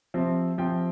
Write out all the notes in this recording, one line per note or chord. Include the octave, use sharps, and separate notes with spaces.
C3 F3 C4
C3 F3 C4 G5